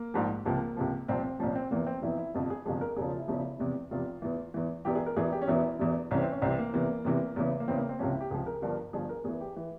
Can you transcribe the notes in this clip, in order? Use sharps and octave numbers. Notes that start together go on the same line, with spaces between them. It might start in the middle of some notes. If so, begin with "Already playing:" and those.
Already playing: A#3
A#1 G#2 F3
C#2 C3 F3 A#3
C#2 C3 F3
C2 A#2 F3 C4
C4
C2 A#2 F3 C#4
C4
F1 E2 E3 A#3
C4
F1 E2 E3 E4
E4
G1 F2 C3 F3 F4
G#4
G1 F2 C3 F3 G#4
A#4
E1 E2 C#3 F3 G#4
F4
E4
E1 E2 C#3 F3 E4
F1 E2 C3
F1 E2 C3 F4
E2 E3
E2 E3
E1 E2 E3 G4
G#4
A#4
E1 E2 E3 G#4
G4
C#4
E1 E2 E3 E4
E1 E2 E3
C2 C3 E3 C#4
C4
C#4
C2 C3 E3 C4
A#3
E2 C3 E3 A#3
E2 C3 E3
E2 C#3 E3
A#3
E2 C#3 E3 C4
A#3
C4
C#2 C3 F3 C#4
E4
G4
C#2 C3 F3 G#4
A#4
G1 G2 F3
G1 G2 F3 G#4
A#4
E2 E3 G#4
G4
E3